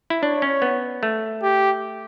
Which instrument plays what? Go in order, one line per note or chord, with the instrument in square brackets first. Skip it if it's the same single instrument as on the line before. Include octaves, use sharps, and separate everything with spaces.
[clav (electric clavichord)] E4
[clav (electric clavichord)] D4 [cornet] C#5
[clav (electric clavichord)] C#4
B3
A3
[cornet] G4